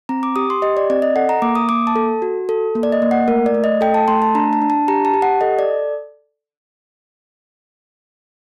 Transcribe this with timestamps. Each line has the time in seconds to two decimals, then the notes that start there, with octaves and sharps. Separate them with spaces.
0.09 C4 A#5
0.23 D6
0.36 G4 D#6
0.50 C6
0.62 G4 D#5
0.77 D5
0.90 C4 D5
1.02 D#5
1.15 A4 F#5
1.29 A#5
1.42 A#3 D6
1.55 D#6
1.69 A#3 D6
1.87 A5
1.96 A4
2.22 F#4
2.49 A4
2.75 A#3
2.83 D5
2.92 D#5
3.02 A#3
3.11 F#5
3.28 A3 A#4
3.46 D5
3.54 A3
3.64 D#5
3.81 A4 G5
3.94 A5
4.08 A3 C6
4.22 A5
4.35 D4 A#5
4.53 A5
4.62 D4
4.70 A5
4.88 G4 A#5
5.05 A5
5.14 G4
5.22 F#5
5.41 A4 D#5
5.59 D5